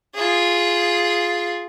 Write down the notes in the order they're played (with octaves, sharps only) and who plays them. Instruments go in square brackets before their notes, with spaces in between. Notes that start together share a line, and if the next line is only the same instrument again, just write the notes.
[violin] F4 G#4